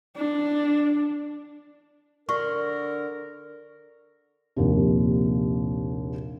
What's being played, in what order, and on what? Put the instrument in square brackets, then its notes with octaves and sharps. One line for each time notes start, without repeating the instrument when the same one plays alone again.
[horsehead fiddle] D4
[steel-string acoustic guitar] D3 [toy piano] F#4 C#6 [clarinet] A#4
[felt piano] A#1 D#2 C3